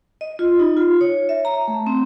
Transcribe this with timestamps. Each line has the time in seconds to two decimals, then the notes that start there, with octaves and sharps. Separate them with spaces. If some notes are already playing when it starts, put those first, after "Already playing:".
0.21 D#5
0.39 F4
0.59 D#4
0.77 F4
1.01 C#5
1.29 E5
1.45 A#5
1.68 A3
1.87 C4